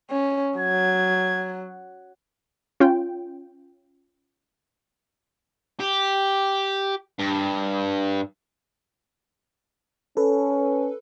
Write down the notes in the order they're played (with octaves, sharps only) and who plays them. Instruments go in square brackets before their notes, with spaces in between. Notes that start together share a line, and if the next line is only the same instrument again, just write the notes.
[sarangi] C#4
[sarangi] F#3 [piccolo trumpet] G#6
[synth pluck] C#4 F4 G5
[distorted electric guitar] G4
G2
[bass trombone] C#4 [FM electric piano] A4 B4